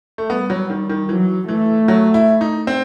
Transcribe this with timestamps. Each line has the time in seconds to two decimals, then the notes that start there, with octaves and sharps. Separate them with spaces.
0.18 A3
0.30 G3 B3
0.50 F#3
0.70 D#3
0.89 D#3
1.09 E3 F#3
1.48 E3 A3
1.88 F#3
2.14 E4
2.41 D#4
2.67 C4